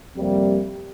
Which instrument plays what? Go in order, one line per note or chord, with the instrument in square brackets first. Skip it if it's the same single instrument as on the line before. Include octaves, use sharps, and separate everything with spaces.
[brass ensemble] F2 C3 G3 A#3